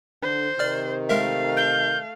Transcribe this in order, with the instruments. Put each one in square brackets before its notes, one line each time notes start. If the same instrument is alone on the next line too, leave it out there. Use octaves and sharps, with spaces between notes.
[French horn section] D3 [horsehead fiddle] C5
[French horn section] C3 D#3 [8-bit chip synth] D5 F6
[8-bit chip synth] G#3 A#4 E5 [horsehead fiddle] A3 F5
[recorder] G6